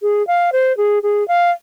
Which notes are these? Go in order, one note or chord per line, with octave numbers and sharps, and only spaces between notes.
G#4
F5
C5
G#4
G#4
F5